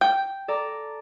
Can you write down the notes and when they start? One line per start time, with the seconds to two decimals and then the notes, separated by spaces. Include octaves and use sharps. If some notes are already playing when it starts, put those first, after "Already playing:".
0.01 G5
0.48 A4 D5 A#5